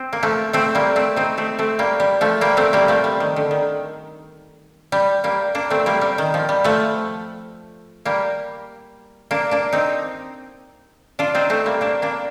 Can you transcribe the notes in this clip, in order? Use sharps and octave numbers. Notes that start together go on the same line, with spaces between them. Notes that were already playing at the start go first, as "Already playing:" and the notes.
Already playing: C4
A#3
F3 A3
A3 C4
G3 A#3
A3 C4
C4 D#4
A3 C4
A3 C4
G3 A#3
G3
F3 A3
G3 A#3
A3 C4
G3 A#3
F3 A3
G3
D#3
D3
D#3
G3
G3 A#3
A#3 D4
A3 C4
G3 A#3
G3
D#3
F3
G3
F3 A3
G3 A#3
A#3 D4
A#3 D4
C4 D#4
D4 F4
C4 D#4
A3 C4
G3 A#3
A#3 D4
A#3 D4